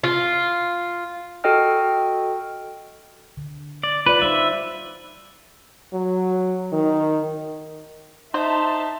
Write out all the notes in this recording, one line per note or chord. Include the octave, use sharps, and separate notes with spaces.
F4
F#4 A4 D#5 G5 F6
D3
D5
F4 B4 D5
G3 D#4 C5 E5
F#3
D#3
D#4 C5 E5 A5 C6